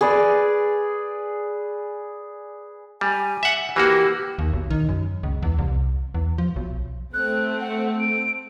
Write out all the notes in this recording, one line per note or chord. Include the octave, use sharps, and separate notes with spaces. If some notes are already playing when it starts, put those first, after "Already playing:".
G#4 B4 D5
G3 G#5
E5 F#5
E3 A#3 F#4 G4
D#2
B1
D#3
F#2
C#2
E2
C2
E2
F3
B1
A3 C4 F#6
F#5
D7